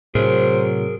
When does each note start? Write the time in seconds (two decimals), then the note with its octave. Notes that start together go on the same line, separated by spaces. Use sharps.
0.15 A2 C3 F#3 G#4 A#4 C5